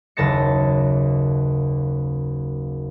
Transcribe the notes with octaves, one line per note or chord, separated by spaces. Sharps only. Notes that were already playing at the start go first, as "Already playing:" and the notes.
F#1 D#2 C#3 A5 A#6 C#7